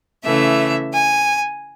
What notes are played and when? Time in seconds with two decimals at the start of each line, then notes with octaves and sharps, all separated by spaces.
0.24 C#3 E3 A3 E5
0.92 G#5